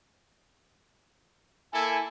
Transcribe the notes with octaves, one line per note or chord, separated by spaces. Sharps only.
A#3 E4 A4 G#5